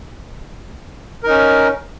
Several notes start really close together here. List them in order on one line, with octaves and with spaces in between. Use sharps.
A#4 D#4 C#4